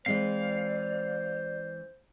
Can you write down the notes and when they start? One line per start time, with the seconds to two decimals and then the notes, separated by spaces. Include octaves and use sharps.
0.06 E3 G#3 C4 C5 D5 F5